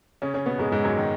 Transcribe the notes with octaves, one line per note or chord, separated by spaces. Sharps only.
C#3 C#4
C#3 C#4
B2 B3
G#2 G#3
G#2 G#3
F#2 F#3
D#3